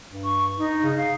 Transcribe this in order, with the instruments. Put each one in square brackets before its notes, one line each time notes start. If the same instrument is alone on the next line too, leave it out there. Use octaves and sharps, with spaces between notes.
[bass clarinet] G2
[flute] C#6
D#4
[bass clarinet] C#3
[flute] F5